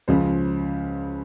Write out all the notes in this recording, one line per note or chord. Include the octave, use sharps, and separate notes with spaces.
C#2 C#3 F3 C5